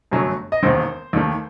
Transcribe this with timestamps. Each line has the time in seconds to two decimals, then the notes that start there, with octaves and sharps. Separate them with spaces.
0.12 G1 F#2 F#3 A3
0.52 D#5
0.63 E1 D#2 D#3 C5
1.13 D#2 D#3 A3